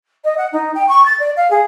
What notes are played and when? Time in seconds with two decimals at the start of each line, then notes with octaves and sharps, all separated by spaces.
0.24 D#5
0.38 F#5
0.52 D#4
0.75 G5
0.89 C#6
1.06 A6
1.19 D5
1.36 F5
1.50 G#4